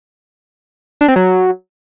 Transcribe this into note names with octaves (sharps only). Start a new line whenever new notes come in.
D4
C4
F#3